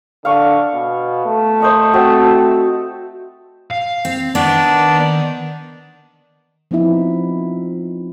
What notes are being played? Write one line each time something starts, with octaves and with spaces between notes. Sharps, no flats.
D3 F5 C#6
B2
A3
C5 D#5 C#6
C4 F#4
F5
C4
D#3 B3 D4 D5
F3 B3 C4 D#4 E4